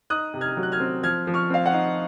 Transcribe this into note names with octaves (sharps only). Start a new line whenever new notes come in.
D#4 D#6 F#6
C3
F6 G#6
F#3
F#6
F6 G#6
C4
F3 F6 G#6
F3
C#6 F6
C4 F5
F#5
D#4